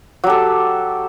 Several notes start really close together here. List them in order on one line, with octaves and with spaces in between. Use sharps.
F#3 G4 A4